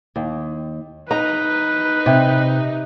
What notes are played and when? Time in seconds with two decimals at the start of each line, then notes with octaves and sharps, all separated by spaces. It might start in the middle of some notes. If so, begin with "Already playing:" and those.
0.16 D#2
1.11 D#4 B4 A#5
2.06 C3